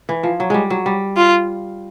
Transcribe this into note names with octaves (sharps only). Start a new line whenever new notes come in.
E3
F3
F#3
G3 G#3
F#3
G3
F4